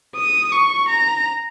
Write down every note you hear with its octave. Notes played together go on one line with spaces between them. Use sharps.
D#6
C#6
A#5